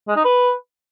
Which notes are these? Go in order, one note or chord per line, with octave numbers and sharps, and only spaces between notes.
G#3
D#4
B4